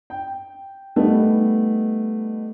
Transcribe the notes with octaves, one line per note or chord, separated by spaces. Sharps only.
G5
G3 A3 B3 D#4